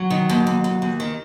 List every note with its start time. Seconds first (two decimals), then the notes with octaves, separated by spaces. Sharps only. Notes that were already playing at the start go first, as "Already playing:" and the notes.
Already playing: F#3
0.10 D#3
0.29 D#2
0.47 D#2
0.64 D#2
0.82 D#2
1.00 D#3